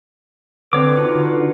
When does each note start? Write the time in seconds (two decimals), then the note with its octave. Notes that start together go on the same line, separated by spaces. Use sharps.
0.73 D3 C4 B4 C#5 D6
0.97 D#4 F4 F#4
1.15 D3